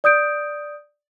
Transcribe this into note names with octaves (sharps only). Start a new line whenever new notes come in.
D5 D#6 G6 D7